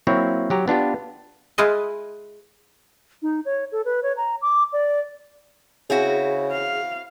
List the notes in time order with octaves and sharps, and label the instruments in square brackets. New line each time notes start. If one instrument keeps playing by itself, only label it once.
[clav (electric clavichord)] F#3 A#3 C4 E4 C#5
F#3 G4 A#5
B3 D4 F4 G4
[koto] G#3 E4 F4 B4 D#5
[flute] D#4
C#5
A4
B4
C#5
A#5
D6
D5
[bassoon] C#3 [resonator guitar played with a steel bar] C4 E4 F#4 [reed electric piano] G#4
[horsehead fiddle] F5